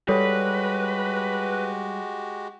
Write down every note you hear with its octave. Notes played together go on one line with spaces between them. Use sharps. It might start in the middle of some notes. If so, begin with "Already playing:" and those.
G3 G#3 F#4 G4 A4 B4 C#5